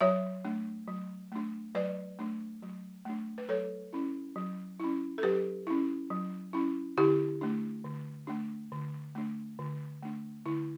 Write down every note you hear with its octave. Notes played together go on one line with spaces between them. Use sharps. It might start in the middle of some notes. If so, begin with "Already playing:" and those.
F#3 C#5 E5
A3 D4
F#3
A3 D4
F#3 B4 D5
A3 D4
F#3
A3 D4
B4
F#3 A4 C#5
C#4 E4
F#3
C#4 E4
A4
F#3 G4 B4
C#4 E4
F#3
C#4 E4
D3 E4 G4
A3 D4
D3
A3 D4
D3
A3 D4
D3
A3 D4
D3 E4